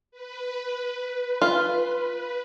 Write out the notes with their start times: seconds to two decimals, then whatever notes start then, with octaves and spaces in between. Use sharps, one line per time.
0.12 B4
1.42 F4